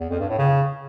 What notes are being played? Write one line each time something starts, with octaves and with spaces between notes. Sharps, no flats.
E2
F2
G2
A2
C#3